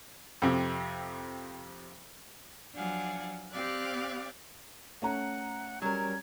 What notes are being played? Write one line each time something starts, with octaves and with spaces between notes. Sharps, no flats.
F2 C3
F3 F#3 D4 F5 F#5 G#5
C4 G4 D5 F5 F#6
A3 C#4 F#5 A#5
F#3 G3 C#4 A#4 G#6